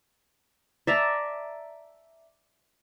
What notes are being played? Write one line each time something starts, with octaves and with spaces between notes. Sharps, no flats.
D5 E5 A5 A#5